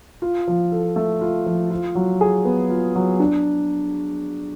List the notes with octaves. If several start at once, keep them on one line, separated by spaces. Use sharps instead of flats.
F4
F3
A4
A3
F4
F3
F4
F#3
G#4
B3
F4
F#3
D4